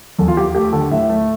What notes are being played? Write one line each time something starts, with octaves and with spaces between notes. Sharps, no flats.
E2 A4
F4
F3 G4
A3 G4
D3 A4
A2 E5
A3